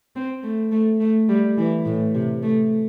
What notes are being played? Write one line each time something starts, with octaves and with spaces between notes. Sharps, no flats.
C4
A3
A3
A3
G3
E3
A2
C3
A3